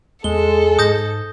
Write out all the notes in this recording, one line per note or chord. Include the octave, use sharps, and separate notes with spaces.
E2 G#3 A4 G7
G#2 D#6 G6 A#6